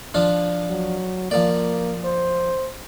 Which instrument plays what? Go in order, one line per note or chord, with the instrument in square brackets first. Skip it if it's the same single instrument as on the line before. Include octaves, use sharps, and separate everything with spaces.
[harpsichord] F3 D4 F4
[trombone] F#3
[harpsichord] F3 D5 [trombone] A#3
[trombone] C5